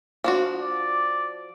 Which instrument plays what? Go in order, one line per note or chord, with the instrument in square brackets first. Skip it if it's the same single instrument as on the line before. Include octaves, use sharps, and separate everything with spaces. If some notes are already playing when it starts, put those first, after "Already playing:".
[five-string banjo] F3 D4 F#4
[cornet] D5